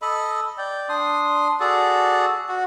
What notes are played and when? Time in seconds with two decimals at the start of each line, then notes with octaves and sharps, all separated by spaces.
0.02 A4 D#5 B5
0.58 D5 G5
0.89 D4 C6 D#6
1.60 F#4 G#4 A4 D5
2.49 F#4